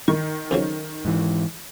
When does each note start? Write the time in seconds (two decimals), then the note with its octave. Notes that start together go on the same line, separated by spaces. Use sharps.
0.08 D#3 C#6
0.51 F2 C#3 F#3
1.05 G#2 E3